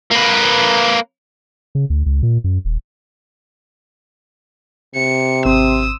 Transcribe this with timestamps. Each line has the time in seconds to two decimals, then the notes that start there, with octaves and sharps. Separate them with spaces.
0.12 A#3 B4
1.75 C#3
1.90 D2
2.06 C#2
2.23 A#2
2.44 F#2
2.65 D#1
4.95 C3 C#7
5.45 G#1 C4 C6 D#6 E6